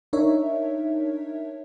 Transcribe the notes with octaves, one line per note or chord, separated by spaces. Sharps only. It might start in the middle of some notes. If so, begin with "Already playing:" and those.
D4 D#4 A#4 C#5 E5